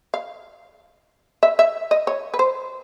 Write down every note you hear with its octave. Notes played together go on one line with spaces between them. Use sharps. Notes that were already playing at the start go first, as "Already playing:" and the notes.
F5
E5
E5
D#5
C#5
B4
C5